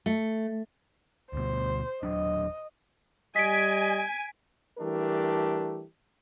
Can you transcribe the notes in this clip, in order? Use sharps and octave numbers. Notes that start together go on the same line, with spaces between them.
A3
D2 B2 C5
D#1 F#3 D4 D#5
G3 D#5 G#5 B6 D7
E3 G3 A3 D4 G4 A#4